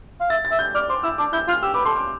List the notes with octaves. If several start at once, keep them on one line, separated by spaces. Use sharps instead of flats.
F5
E5 A6
A6
E5
G6
D5 F6
C5 D6
E4 E6
D4 D6
E4 G6
F4 F6
G4 E6
B4 D6
A4 C6
D6